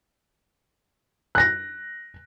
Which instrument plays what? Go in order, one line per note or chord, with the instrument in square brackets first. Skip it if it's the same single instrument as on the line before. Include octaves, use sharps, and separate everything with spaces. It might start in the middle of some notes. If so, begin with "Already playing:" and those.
[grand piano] F#6 A#6